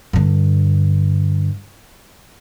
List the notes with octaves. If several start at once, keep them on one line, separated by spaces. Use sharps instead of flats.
G2 D3